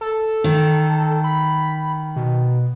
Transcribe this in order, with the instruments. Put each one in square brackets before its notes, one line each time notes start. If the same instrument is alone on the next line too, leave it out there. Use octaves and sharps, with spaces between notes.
[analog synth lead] A4
[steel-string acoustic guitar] D#3
[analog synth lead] B5
B2